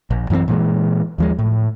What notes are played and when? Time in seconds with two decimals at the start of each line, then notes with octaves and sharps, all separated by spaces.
0.11 A#1
0.30 F#2 E3 A3 C4
0.48 A#2 E3 G#3
1.18 D#2 F3 G#3
1.39 A2